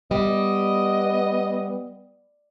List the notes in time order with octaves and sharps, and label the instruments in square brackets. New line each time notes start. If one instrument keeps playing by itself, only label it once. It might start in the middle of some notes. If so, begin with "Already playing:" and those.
[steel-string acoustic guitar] G3 [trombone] B3 [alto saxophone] D#5